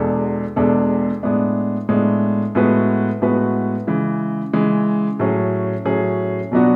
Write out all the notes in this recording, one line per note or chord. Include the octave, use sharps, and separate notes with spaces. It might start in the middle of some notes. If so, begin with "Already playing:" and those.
Already playing: E2 B2 G#3 D4 A4
E2 B2 G#3 D4 A4
A2 G#3 B3 D4
A2 G#3 B3 D4
A2 G#3 B3 F#4 B4
A2 G#3 B3 F#4 B4
C#3 E3 G#3
C#3 E3 G#3
A2 F#3 C#4 G#4
A2 F#3 C#4 G#4
B2 F#3 B3 D4 F#4